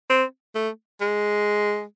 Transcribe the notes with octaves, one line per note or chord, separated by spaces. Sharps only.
C4
A3
G#3